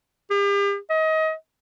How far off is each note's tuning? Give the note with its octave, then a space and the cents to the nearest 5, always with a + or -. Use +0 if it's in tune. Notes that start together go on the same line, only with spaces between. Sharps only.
G4 +40
D#5 +30